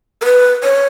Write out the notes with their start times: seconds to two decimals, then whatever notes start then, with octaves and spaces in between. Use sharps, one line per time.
0.22 A#4
0.25 B4
0.64 C#5